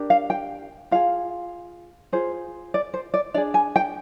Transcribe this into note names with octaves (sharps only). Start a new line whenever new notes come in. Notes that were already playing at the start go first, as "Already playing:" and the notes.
Already playing: D4 G4 A#4
F5
G5
F4 G#4 F5
F4 G#4 C5
D5
C5
D5
D4 G#4 D5
G#5
G5